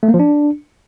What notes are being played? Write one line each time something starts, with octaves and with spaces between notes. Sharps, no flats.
A3
A#3
F3
D4